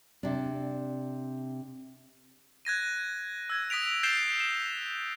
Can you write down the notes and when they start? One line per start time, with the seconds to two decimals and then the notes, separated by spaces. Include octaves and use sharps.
0.23 C3 D4
2.65 F#6 G#6 A#6 D#7
3.50 E6 G#6
3.70 D#6 A#6 B6 D7 F7
4.03 G6 A6 C7 D7 E7 G7
4.40 E7